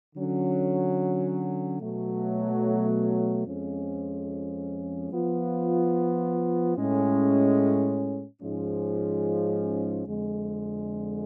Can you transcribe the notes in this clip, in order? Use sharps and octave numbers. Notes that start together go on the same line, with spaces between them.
D3 F#3 C#4
B2 F#3 A3
F2 F3 G#3 C#4
F3 B3 F4
A2 G#3 C#4
G#2 F3 G#3 C#4
F2 D3 G#3